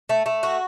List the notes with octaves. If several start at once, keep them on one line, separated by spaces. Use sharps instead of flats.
A3
A3
F#4